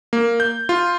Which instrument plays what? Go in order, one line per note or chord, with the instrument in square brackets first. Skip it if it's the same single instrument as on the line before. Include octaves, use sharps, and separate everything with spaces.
[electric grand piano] A#3
G6
F4